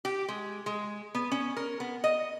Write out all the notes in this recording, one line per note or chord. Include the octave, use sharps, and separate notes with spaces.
G4
G#3
G#3
B3
C#4
A#4
B3
D#5